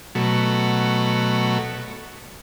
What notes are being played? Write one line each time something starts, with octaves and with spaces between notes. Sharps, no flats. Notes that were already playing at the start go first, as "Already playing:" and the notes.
B2 F#3 A3